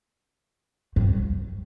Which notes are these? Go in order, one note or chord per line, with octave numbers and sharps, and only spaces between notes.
G2